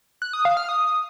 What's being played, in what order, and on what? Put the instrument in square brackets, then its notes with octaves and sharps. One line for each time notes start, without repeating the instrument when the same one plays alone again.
[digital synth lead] F#6
D#6
F5
F6
D#6